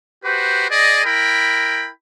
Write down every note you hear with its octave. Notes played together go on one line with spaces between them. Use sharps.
F#4 G4 B4 C5
G#4 D5 D#5
E4 A#4 G5 B5